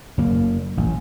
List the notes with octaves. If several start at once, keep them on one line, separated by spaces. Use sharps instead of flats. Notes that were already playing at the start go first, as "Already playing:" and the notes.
F#1 A#3
A1